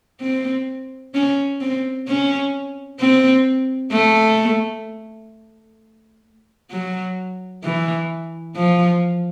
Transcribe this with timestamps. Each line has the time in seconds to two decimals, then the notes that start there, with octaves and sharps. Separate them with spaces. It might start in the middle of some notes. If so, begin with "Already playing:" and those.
0.21 C4
1.14 C#4
1.61 C4
2.08 C#4
3.00 C4
3.92 A3
6.71 F#3
7.64 E3
8.57 F3